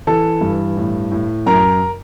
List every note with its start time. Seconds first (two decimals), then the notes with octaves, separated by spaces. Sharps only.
0.07 E3 A4 A5
0.41 G2
0.77 A2
1.12 A2
1.46 F#2 A#4 A#5